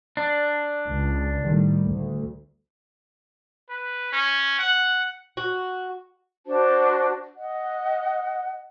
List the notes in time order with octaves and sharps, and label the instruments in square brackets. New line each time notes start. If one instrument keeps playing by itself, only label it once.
[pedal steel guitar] D4
[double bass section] C#2
A2 D#3 G3
D2
[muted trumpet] B4
C#4
F#5
[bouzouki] F#4
[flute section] D4 F#4 C5 A5
D#5 F#5